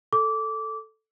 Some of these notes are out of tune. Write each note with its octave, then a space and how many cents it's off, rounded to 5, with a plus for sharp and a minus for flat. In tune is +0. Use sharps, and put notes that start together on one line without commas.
A4 +0 D6 -20